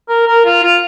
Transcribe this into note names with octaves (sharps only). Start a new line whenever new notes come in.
A#4
A#4
F4
F4